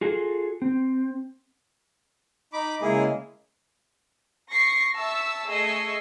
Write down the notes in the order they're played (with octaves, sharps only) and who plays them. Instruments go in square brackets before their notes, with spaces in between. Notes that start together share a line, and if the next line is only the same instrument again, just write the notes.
[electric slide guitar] F4 F#4 G#4 A4
C4
[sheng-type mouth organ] D#4 B5 D6
[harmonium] C#3 G#3 [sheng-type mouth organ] A#3 E4 G#4
[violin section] C#6 A#6 C7
E5 A5 C#6 E6
A3 G#4 D#5 C#6 E6 C7